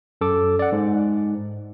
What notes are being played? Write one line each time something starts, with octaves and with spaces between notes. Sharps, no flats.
F#2 A4 D6
D5 F#5
G#2